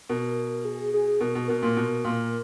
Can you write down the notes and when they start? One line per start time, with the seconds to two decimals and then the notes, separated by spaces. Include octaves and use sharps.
0.09 B2 A#4
0.65 G#4
0.94 G#4
1.20 B2 A#4
1.35 B2
1.47 B2 A#4
1.63 A#2
1.77 B2
2.04 A#2